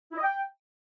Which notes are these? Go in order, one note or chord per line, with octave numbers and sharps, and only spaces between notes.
E4
D#5
G5